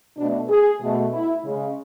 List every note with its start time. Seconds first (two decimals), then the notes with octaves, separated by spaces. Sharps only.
0.17 B2 A3 D4
0.49 G#4
0.80 B2 A3
1.12 E4
1.44 C#3 G#3